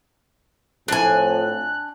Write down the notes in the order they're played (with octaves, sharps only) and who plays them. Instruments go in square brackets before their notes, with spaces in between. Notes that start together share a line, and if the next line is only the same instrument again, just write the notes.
[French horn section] A2 F3 C4 [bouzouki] D4 G#5 [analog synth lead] F#6